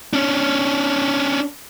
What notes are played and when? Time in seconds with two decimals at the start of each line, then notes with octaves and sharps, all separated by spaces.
0.13 C#4 D4